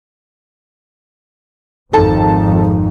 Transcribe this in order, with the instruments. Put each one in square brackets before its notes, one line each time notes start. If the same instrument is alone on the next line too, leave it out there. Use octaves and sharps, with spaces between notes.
[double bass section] G#1 F2 [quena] D#4 [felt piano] A4 A5